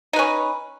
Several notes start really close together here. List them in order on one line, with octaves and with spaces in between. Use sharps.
D#4 B4 C#4